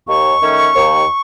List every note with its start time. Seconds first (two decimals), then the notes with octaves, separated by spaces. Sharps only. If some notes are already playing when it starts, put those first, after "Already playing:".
0.07 D#2 C#6
0.41 D#3 A3 C#4
0.75 D#2